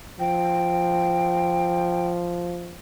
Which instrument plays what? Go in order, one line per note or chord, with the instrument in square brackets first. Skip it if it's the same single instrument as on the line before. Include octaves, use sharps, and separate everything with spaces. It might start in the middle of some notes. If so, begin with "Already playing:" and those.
[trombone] F3 [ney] G5